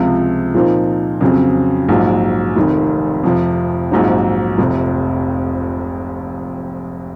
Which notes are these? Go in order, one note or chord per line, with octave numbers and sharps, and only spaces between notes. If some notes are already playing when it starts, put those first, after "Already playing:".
Already playing: C#2 C3 F3
A#2 F3 C4 D#4
F2 C#3 F#3 C4
A#1 G#2 F#3
F1 F2 D#3
F2 C3 F3
A#1 G#2 F#3 C4 D#4
F1 F2 C3